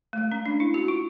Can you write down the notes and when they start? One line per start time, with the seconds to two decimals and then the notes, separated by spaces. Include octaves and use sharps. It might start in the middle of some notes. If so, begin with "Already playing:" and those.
0.13 A3
0.18 G#3
0.32 C#4
0.46 D4
0.60 E4
0.74 F#4
0.88 F4